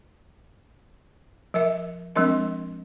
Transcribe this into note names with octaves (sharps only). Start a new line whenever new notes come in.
F3 A#4 E5
F3 G#3 C4 D4 A#4 D#5